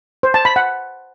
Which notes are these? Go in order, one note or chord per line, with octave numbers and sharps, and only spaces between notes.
C5
A5
B5
F#5